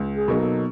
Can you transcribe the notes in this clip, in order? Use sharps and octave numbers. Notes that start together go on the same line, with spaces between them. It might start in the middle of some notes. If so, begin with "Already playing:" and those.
Already playing: C#2
G#4
B2 F#3 A#3 D#4
A4